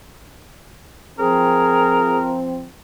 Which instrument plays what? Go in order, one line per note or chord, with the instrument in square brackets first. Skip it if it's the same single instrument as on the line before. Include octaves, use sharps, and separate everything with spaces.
[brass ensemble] F3 C4 [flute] G#4 [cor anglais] A#4